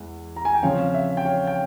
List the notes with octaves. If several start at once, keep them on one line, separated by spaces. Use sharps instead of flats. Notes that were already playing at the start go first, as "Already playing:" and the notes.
Already playing: E2 E3 G#3
A#5
G#5
G5
C#3 F3 C4 C#5 F5
E5
G5
C#5 F5
G5